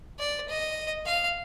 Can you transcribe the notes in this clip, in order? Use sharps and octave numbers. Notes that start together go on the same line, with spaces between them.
D5
D#5
F5